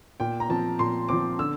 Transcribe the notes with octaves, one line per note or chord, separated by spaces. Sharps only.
A#2 G5
A#5
F3 C4 A5
A#2 C6
F3 C4 D6
D3 E6